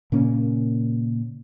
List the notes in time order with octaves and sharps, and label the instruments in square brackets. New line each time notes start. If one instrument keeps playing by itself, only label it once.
[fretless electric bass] A#2 C#3 A#3 C#4